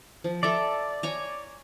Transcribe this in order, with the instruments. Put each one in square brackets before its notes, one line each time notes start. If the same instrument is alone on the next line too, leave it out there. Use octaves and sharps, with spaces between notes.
[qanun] F3
[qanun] A4 E5 A#5 [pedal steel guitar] D5
[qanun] C#5 G#5 A#5